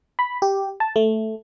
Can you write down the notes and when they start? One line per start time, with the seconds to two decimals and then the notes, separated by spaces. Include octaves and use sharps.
0.19 B5
0.42 G4
0.80 A5
0.96 A3